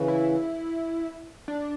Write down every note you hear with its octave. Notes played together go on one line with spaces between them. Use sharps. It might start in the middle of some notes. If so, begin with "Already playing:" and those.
Already playing: C#3 E3
E4
D4